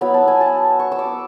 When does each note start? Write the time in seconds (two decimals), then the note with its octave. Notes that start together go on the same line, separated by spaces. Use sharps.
0.01 F#3 B3 E4 B5
0.14 A5
0.28 G#5
0.41 A5
0.79 C#6
0.92 E6
0.99 D6